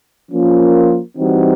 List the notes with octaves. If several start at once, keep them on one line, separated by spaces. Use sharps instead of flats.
F3 A#3 C#4 F4 A#4
E3 G3 C4 D#4 F#4